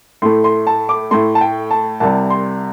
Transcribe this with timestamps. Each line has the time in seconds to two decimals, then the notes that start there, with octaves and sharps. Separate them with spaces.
0.22 A2 A3 C6
0.44 C6
0.67 A5
0.89 D6
1.11 A2 A3 C6
1.35 A5
1.41 G5
1.71 A5
2.00 C2 C3 G3 A5
2.30 C6